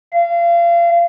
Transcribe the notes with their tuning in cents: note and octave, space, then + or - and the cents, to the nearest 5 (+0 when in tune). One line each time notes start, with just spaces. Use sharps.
F5 -30